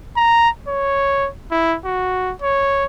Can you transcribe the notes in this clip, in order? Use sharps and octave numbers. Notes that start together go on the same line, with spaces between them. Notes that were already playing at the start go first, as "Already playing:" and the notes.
A#5
C#5
E4
F#4
C#5